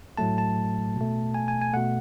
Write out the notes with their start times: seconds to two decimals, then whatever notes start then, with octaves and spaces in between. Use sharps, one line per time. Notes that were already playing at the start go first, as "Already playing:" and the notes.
0.17 A2 F#3 A3 A5
0.38 A5
0.96 B2 A3
1.34 G#5
1.48 G#5
1.61 G#5
1.74 B2 A3 F#5